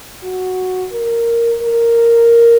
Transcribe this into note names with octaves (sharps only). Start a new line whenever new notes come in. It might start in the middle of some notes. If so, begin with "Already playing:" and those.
F#4
A#4
A#4